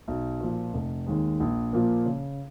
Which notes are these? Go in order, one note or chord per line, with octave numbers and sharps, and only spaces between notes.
B1
A#2 F3
F1
D#2 D#3 G#3
A#1
A#2 F3 A#3
C#3